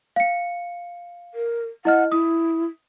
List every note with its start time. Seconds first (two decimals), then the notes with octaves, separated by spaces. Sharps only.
0.16 F5 C#7
1.35 A#4
1.85 E4 D#5 F#5 F6
2.12 E4 D#6